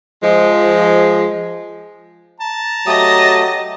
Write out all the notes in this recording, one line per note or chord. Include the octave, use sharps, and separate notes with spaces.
F3 G#3
A5 A#5
F#3 A3 G4 D#5 D#6 A#6